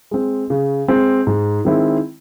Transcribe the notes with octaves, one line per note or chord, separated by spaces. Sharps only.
G#3 C4
C#3
G#3 C4
G#2
D#3 G#3 C4 E4